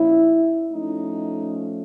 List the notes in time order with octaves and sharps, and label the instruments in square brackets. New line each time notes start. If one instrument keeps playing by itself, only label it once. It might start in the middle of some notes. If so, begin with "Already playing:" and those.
Already playing: [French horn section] A#2 F3 A#3 C#4 E4
F3 A3 C#4 D#4